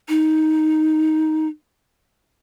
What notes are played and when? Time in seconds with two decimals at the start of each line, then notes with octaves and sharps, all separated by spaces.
0.09 D#4